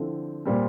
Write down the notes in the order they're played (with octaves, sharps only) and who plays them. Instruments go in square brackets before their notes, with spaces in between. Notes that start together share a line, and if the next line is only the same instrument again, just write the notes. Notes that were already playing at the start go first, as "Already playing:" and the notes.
Already playing: [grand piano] D3 F3 C4 E4
A#2 G3 C4